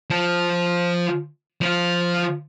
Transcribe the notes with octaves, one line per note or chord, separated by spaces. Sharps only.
F3
F3 F4